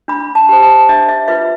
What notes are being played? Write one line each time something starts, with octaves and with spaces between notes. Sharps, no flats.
D4 B5
A5
G4 C5
A5
D4 E5
E5
F4 B4 E5